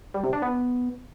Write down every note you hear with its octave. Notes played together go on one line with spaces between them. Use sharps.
G3
C3
D4
B3